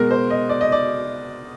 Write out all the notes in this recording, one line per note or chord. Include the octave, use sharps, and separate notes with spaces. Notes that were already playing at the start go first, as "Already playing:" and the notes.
Already playing: B2 G#3 A#4
C5
D#5
D5
D#5
D5